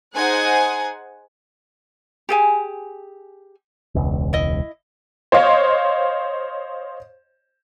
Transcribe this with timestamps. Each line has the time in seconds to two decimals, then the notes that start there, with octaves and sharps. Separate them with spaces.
0.15 D#4 G#4 C5 F#5 G#5
2.29 G4 G#4 G#5
3.95 E1 C#2
4.33 E4 D#5
5.32 C5 C#5 D#5 F5